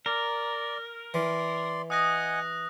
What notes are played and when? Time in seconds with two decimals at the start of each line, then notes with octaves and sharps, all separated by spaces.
0.06 A#4 D5
1.14 E3 D5 C6
1.90 D#5 F#5 G#5 D#6 F#6 A#6